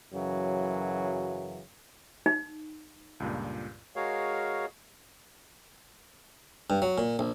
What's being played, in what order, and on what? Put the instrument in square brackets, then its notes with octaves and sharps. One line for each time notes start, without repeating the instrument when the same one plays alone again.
[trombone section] F#2 C#3 E3 F#3
[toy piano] D#4
[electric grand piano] C#2 G2 A#2
[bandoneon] G#3 F#4 G#4 A#4 C#5 F5
[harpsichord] G2
F#3
A#2
A#1